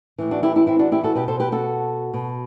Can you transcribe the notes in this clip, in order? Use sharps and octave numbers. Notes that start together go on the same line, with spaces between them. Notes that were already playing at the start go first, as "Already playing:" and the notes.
A2 E3
D4 F#4
E4 G4
E4 G4
C4 E4
D4 F#4
E4 G4
F#4 A4
B2 G4 B4
A4 C5
G4 B4
F#4 A4
B2